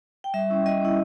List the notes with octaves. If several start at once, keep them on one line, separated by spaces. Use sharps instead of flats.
G5
G3 E5
C#4 E4
G3 D#5
C#4 E4